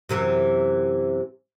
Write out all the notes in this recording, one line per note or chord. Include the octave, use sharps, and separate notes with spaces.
F#2 C3 E3